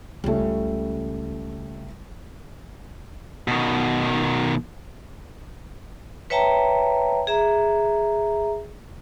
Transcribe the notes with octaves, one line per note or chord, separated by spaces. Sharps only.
C#2 C#3 G3 A3
B2 D#3
B4 C#5 E5 G5 A5 A#5
G#4 E5 A#5